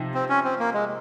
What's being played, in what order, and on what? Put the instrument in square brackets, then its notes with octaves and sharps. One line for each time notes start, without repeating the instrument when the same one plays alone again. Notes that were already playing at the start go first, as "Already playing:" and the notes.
Already playing: [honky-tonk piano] C3 F3 D#4
[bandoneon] C4
C#4
C4
A#3
G#3